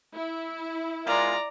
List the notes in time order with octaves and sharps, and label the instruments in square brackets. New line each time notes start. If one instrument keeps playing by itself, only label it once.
[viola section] E4
[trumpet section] G#3 F4 A#4 [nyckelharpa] D5 A#5